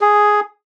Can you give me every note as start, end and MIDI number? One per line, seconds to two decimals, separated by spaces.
0.01 0.40 68